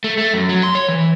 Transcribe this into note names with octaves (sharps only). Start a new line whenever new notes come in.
A3
A3
F#2
F#3
C6
C#5
E3